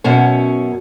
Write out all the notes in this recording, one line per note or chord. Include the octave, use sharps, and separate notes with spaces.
F#2 B2 C#4